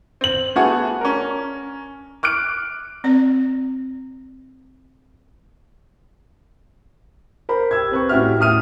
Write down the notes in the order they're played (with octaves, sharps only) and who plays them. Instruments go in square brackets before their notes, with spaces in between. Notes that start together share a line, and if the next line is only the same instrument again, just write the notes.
[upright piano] C4 F#7
A3 B3 F#4 G#4
C#4 D4 A#4
D6 F6 F#6 D7
[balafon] C4 D5
[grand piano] A#4 C5 B5
G4 E6 G#6
C4 B4 C#6
A2 C#4 F#4 G4 E5 F6
A2 E5 D#6 F6 D#7